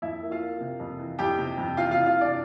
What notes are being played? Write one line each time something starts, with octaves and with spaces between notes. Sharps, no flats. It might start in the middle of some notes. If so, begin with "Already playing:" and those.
F2 E4 E5
A#3
F4 F5
A#3
C3
F2
E3
F2 G4 G5
C3
F2
E3 F4 F5
F4 F5
C3
F4 F5
E3
D4 D5